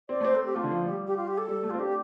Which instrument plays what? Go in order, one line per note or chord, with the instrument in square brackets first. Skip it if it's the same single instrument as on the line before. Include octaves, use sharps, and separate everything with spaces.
[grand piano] C4 [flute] D5
[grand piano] A3
[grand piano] C4 [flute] C5
[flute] A4
G4
[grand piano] A3 [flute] F4
[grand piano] D3
F3
[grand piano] G3 [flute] G4
[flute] G4
F4
G4
A4
[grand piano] G3
A3
[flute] F4
[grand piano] C4
[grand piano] D4 [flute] G4